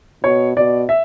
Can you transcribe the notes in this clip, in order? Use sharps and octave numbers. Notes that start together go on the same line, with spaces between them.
B2 C#5
B2 D5
E5